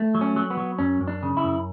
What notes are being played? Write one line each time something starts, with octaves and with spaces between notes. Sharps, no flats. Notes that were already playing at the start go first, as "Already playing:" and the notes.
Already playing: A3
F#3
C#4
F#3
B3
F#3
F#2 C#4
F#2
D4
C#3
E4
F#2